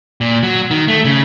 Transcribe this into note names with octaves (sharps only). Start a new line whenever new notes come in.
A#2
F#3
D#3
A3
C#3